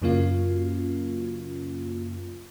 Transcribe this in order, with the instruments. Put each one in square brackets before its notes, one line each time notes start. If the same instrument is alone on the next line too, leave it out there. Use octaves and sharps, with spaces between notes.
[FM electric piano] F#2 C#3 F#3 A#3 C#4 F4